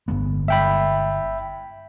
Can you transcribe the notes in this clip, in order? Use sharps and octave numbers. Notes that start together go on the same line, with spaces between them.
G1 G#3 B3
E5 G5 B5